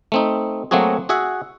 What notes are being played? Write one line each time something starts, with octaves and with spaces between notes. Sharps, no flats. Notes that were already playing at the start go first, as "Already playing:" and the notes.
A3 C4 D#4
F#3 A3 A#3 C4 F#4 G#4
F#4 G#4 E5 F#5